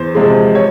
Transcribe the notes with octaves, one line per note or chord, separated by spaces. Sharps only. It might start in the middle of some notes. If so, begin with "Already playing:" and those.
Already playing: E2 C5
C3 F3 G#3
C#5